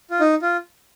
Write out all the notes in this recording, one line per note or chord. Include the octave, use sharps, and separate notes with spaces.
F4
D#4
F4